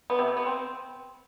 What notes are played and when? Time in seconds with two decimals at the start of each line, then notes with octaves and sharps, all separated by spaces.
0.10 B3
0.19 C3
0.28 A3
0.37 B3
0.46 C4